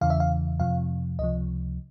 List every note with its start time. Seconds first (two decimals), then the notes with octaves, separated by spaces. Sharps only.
0.01 E2 C#3 E3 F5
0.10 E5
0.20 F5
0.60 F2 C3 F3 F5
1.19 C#2 C3 F3 D#5